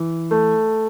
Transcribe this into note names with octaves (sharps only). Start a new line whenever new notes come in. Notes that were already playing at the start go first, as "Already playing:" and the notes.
Already playing: E3
A3